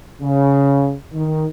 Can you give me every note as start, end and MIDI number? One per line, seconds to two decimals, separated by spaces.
0.22 0.94 49
1.13 1.46 51